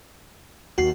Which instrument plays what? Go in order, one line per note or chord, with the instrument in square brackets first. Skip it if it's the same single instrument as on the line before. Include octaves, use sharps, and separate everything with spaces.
[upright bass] D#2 [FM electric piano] F#4 C7